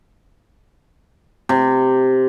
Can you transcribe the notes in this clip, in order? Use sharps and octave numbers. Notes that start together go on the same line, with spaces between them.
C3